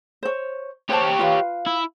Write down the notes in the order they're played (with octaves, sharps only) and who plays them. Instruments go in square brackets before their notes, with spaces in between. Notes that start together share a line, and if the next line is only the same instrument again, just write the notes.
[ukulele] C5 C#5
[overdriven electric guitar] G4 C#5 [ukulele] C5 A5
[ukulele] F4 B4 F5
[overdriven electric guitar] E4